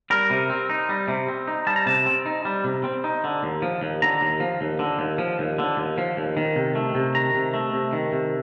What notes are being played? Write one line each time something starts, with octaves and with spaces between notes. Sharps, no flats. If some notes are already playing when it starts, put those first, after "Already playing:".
G3 A#4
C3
C4
D#4
G3
C3
C4
D#4
G3 A5
A#5
C3 A5
C4
D#4
G3
C3
C4
D#4
D3
D#2
F3
D#2
D3 A#5
D#2
F3
D#2
D3
D#2
F3
D#2
D3
D#2
F3
D#2
D#3
C3
A3
C3
D#3 A#5
C3
A3
C3
D#3
C3